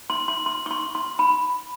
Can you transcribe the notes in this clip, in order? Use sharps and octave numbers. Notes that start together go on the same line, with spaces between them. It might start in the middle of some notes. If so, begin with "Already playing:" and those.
C6
C6
C6
C#6
C6
C6
B5